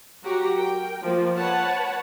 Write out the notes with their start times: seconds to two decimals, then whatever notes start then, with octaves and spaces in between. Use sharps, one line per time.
0.23 F#3 F#4 G4 A#5
0.57 A#4 G5
1.02 F3 A#3
1.35 B4 C#5 F#5 A5